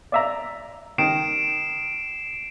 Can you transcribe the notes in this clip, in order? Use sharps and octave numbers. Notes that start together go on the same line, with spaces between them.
D5 E5 A#5
D#3 C7 D7 E7